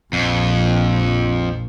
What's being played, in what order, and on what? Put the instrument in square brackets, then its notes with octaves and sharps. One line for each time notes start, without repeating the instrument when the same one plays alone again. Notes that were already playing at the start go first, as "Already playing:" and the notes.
[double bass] A#1 [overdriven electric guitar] F2